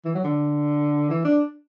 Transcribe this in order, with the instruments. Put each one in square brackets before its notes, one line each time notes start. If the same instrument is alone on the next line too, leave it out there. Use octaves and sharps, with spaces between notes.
[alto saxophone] E3
F#3
D3
E3
D4